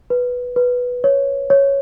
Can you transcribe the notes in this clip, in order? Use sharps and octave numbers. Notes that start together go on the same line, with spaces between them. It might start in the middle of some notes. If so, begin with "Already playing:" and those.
B4
B4
C#5
C#5